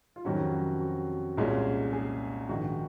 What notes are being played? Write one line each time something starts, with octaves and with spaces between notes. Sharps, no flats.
F4
F2 C3 D#3 F#3 C#4 F#4
F#4
F#4
C2 A#2 G#3 C#4
G#4
A#1 G#2 D#3 F#4